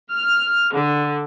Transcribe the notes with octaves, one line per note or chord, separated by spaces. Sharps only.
F6
D3